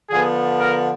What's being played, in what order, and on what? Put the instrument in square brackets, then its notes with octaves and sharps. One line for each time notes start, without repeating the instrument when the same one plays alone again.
[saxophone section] D3 F3 B3 [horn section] G#4
[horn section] A#4